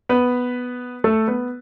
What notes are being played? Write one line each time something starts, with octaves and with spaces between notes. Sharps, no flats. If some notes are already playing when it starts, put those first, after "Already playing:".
B3 B4
A3 A4
B3 B4